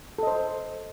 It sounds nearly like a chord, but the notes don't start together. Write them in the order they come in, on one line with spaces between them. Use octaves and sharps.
A4 D#5 C5